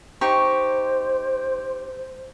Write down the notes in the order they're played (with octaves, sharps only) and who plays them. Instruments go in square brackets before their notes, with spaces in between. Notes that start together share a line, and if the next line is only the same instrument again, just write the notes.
[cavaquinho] D#4 G4 C#6 [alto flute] C5